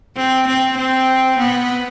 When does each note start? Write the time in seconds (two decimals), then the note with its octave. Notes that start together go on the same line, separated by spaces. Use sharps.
0.17 C4
0.47 C4
0.77 C4
1.38 B3